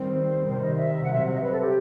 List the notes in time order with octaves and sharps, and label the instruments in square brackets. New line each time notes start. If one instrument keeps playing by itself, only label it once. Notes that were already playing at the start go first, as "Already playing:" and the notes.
Already playing: [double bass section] D#3 G3 C4
[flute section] C5
[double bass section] C3 D#3 G3 [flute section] C5
[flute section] D#5
E5
[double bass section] C3 F#3 C4 [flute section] F#5
[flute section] E5
D#5
B4
A4
G4